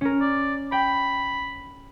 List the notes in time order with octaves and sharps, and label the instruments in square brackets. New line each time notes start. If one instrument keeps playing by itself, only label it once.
[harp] C#4 A#4
[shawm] D5
[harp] G5 [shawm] B5